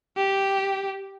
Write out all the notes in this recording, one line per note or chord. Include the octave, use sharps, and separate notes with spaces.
G4